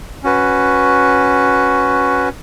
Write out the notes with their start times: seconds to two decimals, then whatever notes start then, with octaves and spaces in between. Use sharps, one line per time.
0.23 C#4 F#4 B4